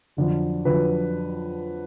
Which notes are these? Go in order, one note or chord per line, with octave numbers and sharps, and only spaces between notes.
F2 D3 F#3
F2 D3 F#3 B4